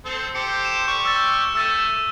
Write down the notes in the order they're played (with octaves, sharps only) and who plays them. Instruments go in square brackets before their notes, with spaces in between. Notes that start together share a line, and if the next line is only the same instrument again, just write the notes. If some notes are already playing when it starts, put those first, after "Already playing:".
[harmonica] C4 A4 C5
[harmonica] G4 A4 C5 [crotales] C#7
[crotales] E7
[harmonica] G3 G4 C#6
[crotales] E6 A6
[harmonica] A3 [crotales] E6 A6 D#7